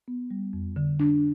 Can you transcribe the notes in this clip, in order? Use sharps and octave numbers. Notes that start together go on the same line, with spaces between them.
B3
G3
F2
D3
D4